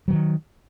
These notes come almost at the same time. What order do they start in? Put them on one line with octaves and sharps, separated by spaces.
F#3 E3 D#3